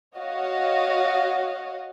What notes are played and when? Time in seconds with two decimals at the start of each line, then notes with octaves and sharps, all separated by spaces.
0.18 F#4 C#5 D#5 F5 F#5